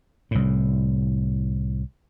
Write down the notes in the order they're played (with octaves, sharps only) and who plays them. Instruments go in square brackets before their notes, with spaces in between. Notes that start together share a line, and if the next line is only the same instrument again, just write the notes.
[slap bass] C2 A2